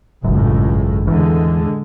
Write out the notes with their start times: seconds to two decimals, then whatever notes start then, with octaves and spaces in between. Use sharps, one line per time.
0.24 G#1 C#2 F#2 A2
1.07 E2 D3 G#3